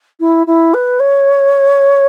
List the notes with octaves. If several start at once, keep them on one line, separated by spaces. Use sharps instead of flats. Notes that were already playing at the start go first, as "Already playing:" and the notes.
E4
E4
B4
C#5